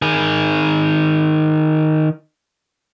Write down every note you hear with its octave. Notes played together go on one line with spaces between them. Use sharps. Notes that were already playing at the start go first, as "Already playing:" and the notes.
D#3 G#4